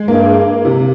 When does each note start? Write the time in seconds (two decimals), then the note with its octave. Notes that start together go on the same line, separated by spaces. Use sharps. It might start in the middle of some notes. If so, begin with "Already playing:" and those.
Already playing: G#3
0.08 G2 A#3
0.65 C3